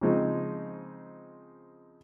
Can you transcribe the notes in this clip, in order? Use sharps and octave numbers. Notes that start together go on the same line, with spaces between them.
C#3 F3 G#3 C4 D#4